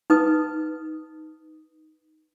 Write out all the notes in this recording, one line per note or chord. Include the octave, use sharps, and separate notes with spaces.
D#4 B4 D#6